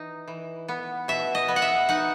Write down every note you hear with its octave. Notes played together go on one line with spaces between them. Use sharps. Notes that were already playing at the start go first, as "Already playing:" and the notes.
Already playing: E3 D#4
E3
B3
B2 E5
D#5
B3
F#5
E5
D#4 F#5